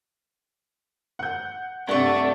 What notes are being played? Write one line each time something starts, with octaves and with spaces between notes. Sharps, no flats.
F#5 G6
G2 C3 A3 D5 F#5 C#6